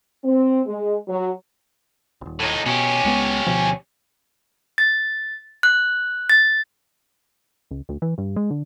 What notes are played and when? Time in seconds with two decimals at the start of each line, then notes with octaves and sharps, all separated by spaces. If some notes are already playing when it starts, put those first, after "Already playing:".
0.24 C4
0.67 G#3
1.08 F#3
2.21 D#1 G#1
2.40 A2 D#4
2.66 B2 C#4 G4
3.04 C#2 G#3 B3
3.46 D2 B2 F3
4.78 A6
5.63 F#6
6.30 A6
7.71 C#2
7.89 D2
8.02 E3
8.18 G2
8.36 G#3
8.51 D3